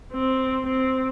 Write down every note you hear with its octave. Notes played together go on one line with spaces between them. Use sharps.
C4
C4